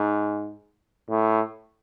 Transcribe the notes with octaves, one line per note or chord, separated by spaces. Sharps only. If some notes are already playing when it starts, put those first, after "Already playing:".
Already playing: G#2
A2